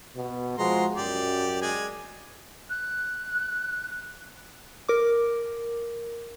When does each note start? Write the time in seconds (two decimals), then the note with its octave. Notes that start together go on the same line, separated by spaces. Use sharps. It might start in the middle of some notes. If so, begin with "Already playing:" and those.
0.16 B2
0.58 F3 G#3 F#4 A#5 C6
0.96 F#2 G4 D5
1.62 G#3 D5 G#5
2.69 F#6
4.89 A#4 D6